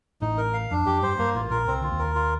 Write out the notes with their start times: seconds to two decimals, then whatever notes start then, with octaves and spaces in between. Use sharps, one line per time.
0.21 A1 A2 D#4
0.37 A#4
0.54 F5
0.71 F2 D4
0.86 F2 G4
1.02 G2 C5
1.18 G2 A#3
1.35 A1 A2 F4
1.51 A#1 A#2 A#4
1.67 C2 C3 C4
1.81 D3 F4
1.91 D#2 D#3
1.99 A#4
2.16 F4